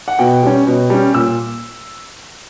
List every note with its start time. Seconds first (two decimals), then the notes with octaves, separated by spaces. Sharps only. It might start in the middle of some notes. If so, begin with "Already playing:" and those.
0.08 F#5
0.19 B2 G5
0.43 G3 C#4
0.67 B2
0.90 G3 C#4
1.14 A#2 E6